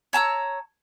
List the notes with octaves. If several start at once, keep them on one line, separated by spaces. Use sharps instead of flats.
C#5 A5 A#5 E6